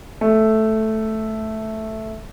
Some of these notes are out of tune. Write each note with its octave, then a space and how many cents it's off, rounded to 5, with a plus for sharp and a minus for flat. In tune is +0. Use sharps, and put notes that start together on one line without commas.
A3 -5